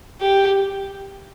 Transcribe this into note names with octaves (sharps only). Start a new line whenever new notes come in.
G4